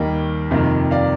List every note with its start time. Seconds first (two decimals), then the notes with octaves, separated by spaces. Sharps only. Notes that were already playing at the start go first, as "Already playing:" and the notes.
Already playing: D#2 D#3 G3 A#3 D#5 G5
0.51 F2 C3 D#3 G3 A#3
0.91 D5 F5